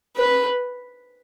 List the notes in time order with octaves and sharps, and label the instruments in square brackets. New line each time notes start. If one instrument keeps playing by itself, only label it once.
[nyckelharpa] B4